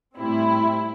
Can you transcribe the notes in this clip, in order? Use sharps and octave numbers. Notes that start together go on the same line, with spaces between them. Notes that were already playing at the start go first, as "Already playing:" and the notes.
A2 G3 C4 E4